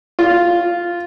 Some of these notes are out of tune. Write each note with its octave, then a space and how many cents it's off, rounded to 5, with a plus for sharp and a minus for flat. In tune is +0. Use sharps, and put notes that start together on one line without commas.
F4 -5